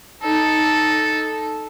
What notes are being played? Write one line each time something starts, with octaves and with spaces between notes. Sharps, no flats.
D#4 A4